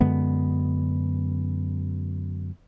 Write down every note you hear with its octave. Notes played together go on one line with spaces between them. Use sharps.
F#2 D3 G#3 B3